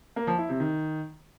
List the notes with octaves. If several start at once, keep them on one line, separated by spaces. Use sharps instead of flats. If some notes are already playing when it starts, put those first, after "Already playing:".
A#3
F3
E4
C3
D#3